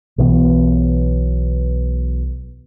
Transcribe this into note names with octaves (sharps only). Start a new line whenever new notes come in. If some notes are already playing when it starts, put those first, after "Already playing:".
B1 B2 E3 B3